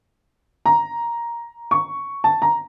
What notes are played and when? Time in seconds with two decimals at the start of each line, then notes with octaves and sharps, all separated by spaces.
0.66 A#5
1.71 C#6
2.24 A5
2.42 A#5